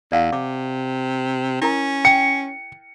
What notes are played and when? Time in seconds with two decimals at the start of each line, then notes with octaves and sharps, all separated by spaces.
0.12 E2 D5 F5 F#5
0.33 C3 D6
1.61 C#4 E4 A#4 A#5
2.05 G5 C#7